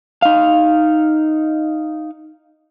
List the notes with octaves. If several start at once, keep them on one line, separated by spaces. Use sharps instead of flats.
D#4 F5